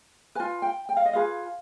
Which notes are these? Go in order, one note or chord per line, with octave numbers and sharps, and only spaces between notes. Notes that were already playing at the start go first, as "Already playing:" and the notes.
F4 B4 G#5
G5
G5
F5
D#5
F4 G#4 B4 F5